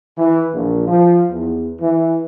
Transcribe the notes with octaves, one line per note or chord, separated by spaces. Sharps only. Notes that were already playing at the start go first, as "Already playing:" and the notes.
E3
A#1
F3
E2
E3